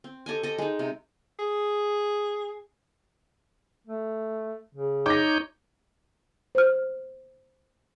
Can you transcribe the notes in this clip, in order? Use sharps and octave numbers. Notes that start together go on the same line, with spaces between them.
C4
G4 A4 D#5 G#5
A4 D#5
G#3 D#4
C3
G#4
A3
C#3
D#4 C#5 D6 G6 A#6
C5 F6